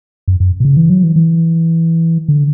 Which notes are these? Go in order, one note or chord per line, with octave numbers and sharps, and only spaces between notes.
F#2
F#2
B2
C#3
E3
F#3
E3
E3
D3